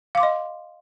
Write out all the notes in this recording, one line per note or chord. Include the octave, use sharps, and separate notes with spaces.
D#5 F5 C6 D6